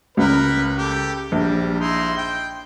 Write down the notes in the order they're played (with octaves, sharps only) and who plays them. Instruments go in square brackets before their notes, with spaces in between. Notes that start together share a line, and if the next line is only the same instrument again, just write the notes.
[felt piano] C#2 [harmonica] A#4 B4
[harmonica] G4 A4
[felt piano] A#1 [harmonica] G3
[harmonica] D#4 E4 C6
G5